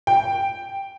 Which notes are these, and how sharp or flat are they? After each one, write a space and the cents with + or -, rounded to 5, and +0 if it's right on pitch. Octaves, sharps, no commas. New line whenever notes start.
G5 +0